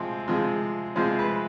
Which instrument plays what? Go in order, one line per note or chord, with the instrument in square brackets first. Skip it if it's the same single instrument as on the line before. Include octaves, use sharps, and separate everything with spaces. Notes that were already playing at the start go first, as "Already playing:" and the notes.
Already playing: [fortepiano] C3 F3 G#3
C3 F3 G#3
C3 F3 G#3 C5
B4